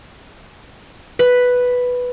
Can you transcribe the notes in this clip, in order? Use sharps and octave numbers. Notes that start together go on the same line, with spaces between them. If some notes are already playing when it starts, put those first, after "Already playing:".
B4